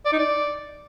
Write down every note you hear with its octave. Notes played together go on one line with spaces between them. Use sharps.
D5
D#4
D5